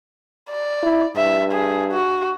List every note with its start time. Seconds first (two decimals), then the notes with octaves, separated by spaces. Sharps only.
0.50 D5
0.83 E4
1.16 G2 E5
1.52 G#4
1.91 F#4